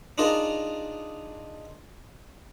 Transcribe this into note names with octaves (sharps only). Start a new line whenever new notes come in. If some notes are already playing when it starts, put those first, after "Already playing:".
D4 D#4 F4 G#4 A#4